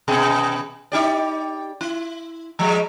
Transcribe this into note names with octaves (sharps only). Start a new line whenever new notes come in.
B2 B3 G#4
D#4 G4 D5
E4
F3 G3 G#3